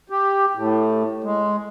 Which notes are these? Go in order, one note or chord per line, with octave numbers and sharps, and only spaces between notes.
G4
A2
G#3